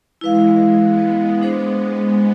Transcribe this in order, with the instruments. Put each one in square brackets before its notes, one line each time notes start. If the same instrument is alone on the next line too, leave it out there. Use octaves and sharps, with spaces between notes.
[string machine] E3 G#3 [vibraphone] E4 B4 F5
[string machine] G#3 B3
[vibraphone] D4 G#4 C5
[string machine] G#3 B3